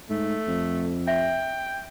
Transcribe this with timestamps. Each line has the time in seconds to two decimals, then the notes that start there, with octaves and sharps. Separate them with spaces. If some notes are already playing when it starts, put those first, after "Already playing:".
0.10 G#2 A3
0.48 F2
1.08 E5 G5